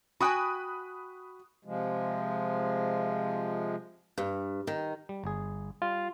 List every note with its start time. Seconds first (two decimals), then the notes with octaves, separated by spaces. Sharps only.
0.20 F#4 G5 G#5 B5 D#6 F#6
1.65 C3 F3 G#3
4.18 G2
4.67 D#3
5.09 G3
5.24 G1 G#4
5.82 G3 F4